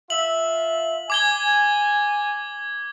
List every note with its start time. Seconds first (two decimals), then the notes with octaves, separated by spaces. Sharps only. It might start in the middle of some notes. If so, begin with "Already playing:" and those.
0.10 F4 E5 F#7
1.10 G#5 D6 G#6 G7